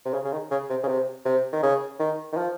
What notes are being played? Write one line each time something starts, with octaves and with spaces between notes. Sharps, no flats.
C3
C#3
C#3
D#3
C#3
C3
C#3
C3
C3
D#3
C#3
D#3
D#3
F3